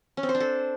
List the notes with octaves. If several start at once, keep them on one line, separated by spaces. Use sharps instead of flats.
C#4
C4
C5
D4
A4